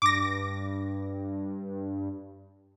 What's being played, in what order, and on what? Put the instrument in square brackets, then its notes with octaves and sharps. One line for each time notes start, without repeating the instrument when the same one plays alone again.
[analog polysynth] G2 [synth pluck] D6 A#6